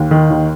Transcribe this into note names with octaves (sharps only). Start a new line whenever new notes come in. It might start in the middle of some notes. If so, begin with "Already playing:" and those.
Already playing: D#2
D#3
D#2